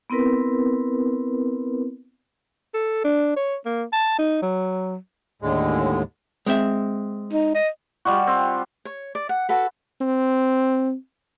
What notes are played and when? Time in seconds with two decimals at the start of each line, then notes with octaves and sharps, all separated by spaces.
0.10 B3 C4 E4 A#4 B4
2.74 A4
3.04 D4
3.36 C#5
3.66 A#3
3.93 A5
4.18 D#4
4.42 F#3
5.42 D#2 A2 D3 G#3
6.46 G#3 C4 E5
7.33 D#4
7.54 D#5
8.05 G3 F4 F#4
8.27 C4
8.85 C#5
9.15 D5
9.29 F#5
9.49 F#4 A4 B4
10.01 C4